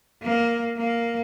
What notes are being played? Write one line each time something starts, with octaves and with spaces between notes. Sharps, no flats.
A#3
A#3